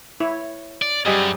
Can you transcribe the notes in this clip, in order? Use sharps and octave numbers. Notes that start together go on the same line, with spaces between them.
E4 C#5
D5
F#2 G3 C4 D#4 G#4